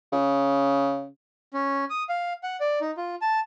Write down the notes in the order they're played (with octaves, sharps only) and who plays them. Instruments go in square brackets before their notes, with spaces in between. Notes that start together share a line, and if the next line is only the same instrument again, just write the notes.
[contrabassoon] C#3
[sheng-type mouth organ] C#4
D#6
F5
F#5
D5
D#4
F4
A5